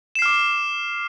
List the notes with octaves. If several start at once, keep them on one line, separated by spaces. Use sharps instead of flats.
D6 F6 C7 E7